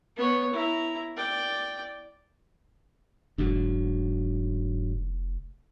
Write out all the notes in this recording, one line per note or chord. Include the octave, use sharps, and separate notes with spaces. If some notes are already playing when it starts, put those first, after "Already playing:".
B3 C#5
E4 A#5
D5 G5
F1 G#2 D3 F#3